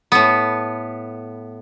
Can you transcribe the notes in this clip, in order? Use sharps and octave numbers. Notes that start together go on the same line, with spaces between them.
A2 B3